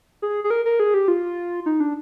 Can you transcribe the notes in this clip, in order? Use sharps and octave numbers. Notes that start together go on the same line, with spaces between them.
G#4
G#4
A#4
A#4
G#4
G4
F4
D#4
D4